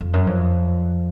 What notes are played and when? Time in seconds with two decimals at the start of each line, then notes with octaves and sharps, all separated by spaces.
0.01 F2
0.13 F#2
0.27 F2